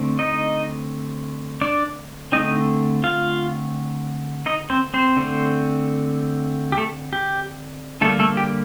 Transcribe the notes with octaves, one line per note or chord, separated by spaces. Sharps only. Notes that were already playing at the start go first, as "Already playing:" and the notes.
Already playing: D3 A3 C4
D#4 D#5
D4 D5
D3 A3 C4 D#4 D#5
F4 F5
D#4 D#5
C4 C5
C4 C5
D3 A3 C4
G4
A3 A4
G4
D3 G3 A3 A#3 A4
A3 A4
G4